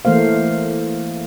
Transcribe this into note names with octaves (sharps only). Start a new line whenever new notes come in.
E3 A3 A#3 C5 F5